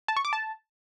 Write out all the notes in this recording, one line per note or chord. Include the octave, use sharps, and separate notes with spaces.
A5
C#6
D6
A5